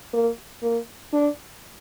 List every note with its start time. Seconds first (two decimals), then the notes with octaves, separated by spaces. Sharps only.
0.13 A#3
0.63 A#3
1.13 D4